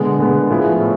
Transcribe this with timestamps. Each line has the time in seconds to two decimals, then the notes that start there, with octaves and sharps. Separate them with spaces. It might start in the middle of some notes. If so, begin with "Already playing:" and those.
Already playing: D3 G#3 B3
0.19 D3 G#3 B3
0.50 A2 F3 B3 E4 G#4
0.81 A2